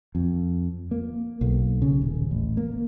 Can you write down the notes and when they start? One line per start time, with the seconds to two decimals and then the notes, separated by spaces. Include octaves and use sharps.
0.15 F2
0.91 A#3
1.41 B1
1.82 C#3
2.02 D#1
2.31 A1
2.57 A#3